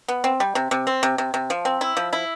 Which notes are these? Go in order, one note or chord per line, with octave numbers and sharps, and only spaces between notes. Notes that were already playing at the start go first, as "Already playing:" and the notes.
B3
C4
G3
C3
C3
C4
C3
C3
C3
F3
C4
E4
F3
E4